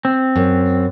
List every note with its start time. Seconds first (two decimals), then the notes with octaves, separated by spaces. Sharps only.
0.05 C4
0.36 F#2